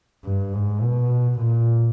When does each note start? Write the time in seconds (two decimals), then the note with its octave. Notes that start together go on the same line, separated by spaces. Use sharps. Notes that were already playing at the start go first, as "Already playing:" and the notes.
0.25 G2
0.54 G#2
0.82 B2
1.39 A#2